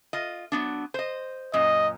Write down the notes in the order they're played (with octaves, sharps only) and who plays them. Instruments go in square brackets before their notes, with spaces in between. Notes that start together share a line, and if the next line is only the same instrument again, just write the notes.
[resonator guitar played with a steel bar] F4 D#5
F#3 B3 D4
C5 D#5
[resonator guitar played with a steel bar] F#2 A#2 [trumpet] D#5